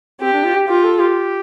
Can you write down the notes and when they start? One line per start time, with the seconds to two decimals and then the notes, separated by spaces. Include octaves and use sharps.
0.20 C4 G4
0.33 D4
0.45 F4
0.56 G4
0.68 F4 G4
0.84 A4
1.00 G4